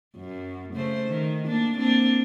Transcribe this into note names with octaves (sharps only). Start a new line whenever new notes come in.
F#2
C#3 A3 C5
D#3
A#3 D4
A#3 C4 D4